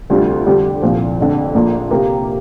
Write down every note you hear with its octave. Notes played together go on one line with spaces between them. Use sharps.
D2 C3 G3 D4 F4
F2 D3 G3 D4 G4
C2 A#2 F3
F1 F2 D3
A#1 A#2 A#3 D4 F4
C3 A#3 G4 A#4